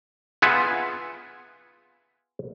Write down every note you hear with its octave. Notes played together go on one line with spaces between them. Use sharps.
B3 F4 G#4 E5 F#5 G#5